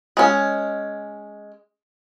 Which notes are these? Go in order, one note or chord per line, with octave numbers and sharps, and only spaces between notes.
G#3 C#4